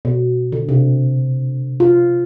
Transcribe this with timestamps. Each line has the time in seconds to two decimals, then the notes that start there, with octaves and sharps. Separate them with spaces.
0.05 B2
0.52 D3
0.69 C3
1.80 F4